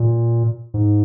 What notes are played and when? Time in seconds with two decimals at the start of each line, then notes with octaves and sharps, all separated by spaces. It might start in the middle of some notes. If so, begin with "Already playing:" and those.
Already playing: A#2
0.74 G#2